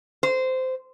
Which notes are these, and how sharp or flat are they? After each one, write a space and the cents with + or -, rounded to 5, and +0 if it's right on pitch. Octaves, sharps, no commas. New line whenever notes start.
C5 -15